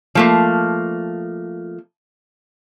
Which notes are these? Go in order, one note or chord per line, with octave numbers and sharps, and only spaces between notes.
F3 A3 A#3